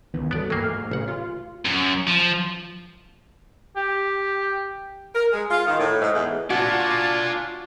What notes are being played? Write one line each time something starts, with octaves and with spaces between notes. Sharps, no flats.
C#2 D#3 E3 B3
G2 B3 F#4 A4 D5
E3 F#3 A#3 A4 G5 C7
G#2 A3 F6 C7
A1 C#3 F#5
F4
F#2
F3
G4
A#4
G#3
F4
D#3
A2
G#2
E2
D4 F4 F#4 D5 G#5 A5